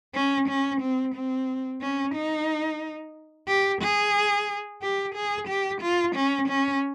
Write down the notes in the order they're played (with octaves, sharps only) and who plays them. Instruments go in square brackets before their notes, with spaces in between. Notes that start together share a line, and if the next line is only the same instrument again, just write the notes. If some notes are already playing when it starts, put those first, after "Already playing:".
[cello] C#4
C#4
C4
C4
C#4
D#4
G4
G#4
G4
G#4
G4
F4
C#4
C#4